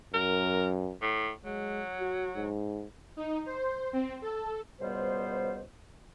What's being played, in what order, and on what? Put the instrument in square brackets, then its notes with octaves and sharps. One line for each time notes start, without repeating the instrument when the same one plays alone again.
[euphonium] F#2 [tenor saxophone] A#4
[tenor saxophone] A2
[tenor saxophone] F#3 [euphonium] G#3
[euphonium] F#4
G#2
[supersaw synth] D#4
C5
C4
A4
[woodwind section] C#2 B2 G3 B3 C5